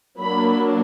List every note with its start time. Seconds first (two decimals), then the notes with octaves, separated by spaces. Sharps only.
0.20 F#3 A#3 D4 B5